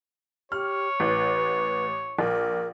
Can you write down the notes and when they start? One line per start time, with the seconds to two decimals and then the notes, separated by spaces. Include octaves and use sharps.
0.52 G4 C#5 F6
1.00 A1 B4
2.19 A#1 A#4